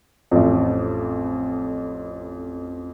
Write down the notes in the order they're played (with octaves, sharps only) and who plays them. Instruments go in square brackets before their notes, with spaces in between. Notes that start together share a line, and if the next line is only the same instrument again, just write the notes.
[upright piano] A1 F2